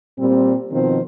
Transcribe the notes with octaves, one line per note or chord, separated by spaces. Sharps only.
A#2 G3 C4
B2 D#3 F3 C4 C5